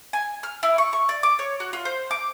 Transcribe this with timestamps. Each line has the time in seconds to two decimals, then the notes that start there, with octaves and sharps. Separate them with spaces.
0.13 G#5
0.43 F6
0.63 E4
0.78 C#6
0.93 C#6
1.09 D5
1.23 D6
1.39 C#5
1.60 F#4
1.73 F4
1.85 C5
2.11 D6